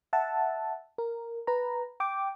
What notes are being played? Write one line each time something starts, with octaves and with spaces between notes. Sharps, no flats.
E5 F#5 A5
A#4
B4 A#5
G5 D6